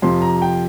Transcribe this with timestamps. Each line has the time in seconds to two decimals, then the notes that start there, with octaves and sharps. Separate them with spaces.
0.02 F2 C3 F3 C6
0.22 A#5
0.42 G5